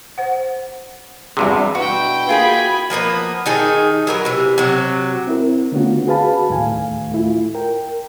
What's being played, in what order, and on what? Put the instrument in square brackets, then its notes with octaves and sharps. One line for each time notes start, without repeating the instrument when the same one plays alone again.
[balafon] C5 F#5
[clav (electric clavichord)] E2 G2 C3 [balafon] G3 F#4 G#4
[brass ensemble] B2 D4 B4 [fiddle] E4 G5 [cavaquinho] F#4
[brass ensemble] A#3 F#4 [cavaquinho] F4 G#4 D#5 [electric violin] G#5 B5
[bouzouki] F3 A#3 B3 B4
D#3 D#4 G#4 A4
F#3 A#4 B4
C3 E3
C3 F#3
[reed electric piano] C4 E4 A#4
D3 A3 B3 C#4 F4 F#4
F#4 G#4 B4 F5 A5 B5
D2 A2 D#3 A3 F5 G#5
A3 E4 F4
A#4 G5